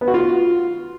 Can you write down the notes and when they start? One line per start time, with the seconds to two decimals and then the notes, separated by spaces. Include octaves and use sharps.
0.01 B3
0.08 F#4
0.14 F4